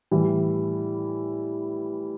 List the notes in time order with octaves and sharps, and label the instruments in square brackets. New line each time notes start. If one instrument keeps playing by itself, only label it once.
[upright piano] A2 E3 G3